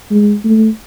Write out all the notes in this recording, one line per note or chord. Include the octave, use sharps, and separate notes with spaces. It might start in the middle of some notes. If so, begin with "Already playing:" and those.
G#3
A3